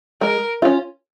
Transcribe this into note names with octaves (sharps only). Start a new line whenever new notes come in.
G#3 A#4
C#4 F4